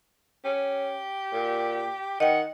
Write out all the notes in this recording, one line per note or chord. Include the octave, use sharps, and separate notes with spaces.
C#4 G4
A#2
D#3 D#5 F#5 G5